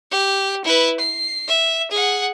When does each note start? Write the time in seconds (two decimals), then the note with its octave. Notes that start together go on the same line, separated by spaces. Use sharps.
0.11 G4
0.65 E4 B4
1.00 C7
1.47 E5
1.91 G#4 F#5